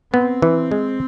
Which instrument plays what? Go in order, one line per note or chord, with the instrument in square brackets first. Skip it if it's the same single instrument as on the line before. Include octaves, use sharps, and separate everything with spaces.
[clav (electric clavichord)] B3 [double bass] C4
[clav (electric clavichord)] E3
G#3